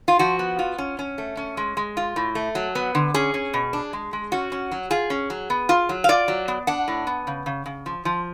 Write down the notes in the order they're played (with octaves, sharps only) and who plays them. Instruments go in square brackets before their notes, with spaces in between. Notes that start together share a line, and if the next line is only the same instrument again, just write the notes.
[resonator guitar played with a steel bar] F4
F3 F#4
B3
F4
C#4
C#4
A3
C#4
G#3
G#3
F4
A2
A3
F#3
B3
D3
C#4 G#4
C#4
B2
D4
G#3
G#3
C#4 F#4
C#4
F#3
F4 G#4
C#4
F#3
B3
F4
F#3
F5
F4 D5
F#3
B3
D4 F#5
A2
B3
C#3
C#3
C#3
F3
F3